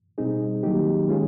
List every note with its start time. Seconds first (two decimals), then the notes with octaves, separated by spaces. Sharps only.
0.18 B2 G3 C4 D#4 G#4
0.63 D#3 F#3 A#3 D#4 G4
1.07 D#3 G#3 C#4 F4 G#4